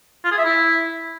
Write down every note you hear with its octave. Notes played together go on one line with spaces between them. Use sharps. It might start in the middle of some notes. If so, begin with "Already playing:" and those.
F4
G#4
E5
E4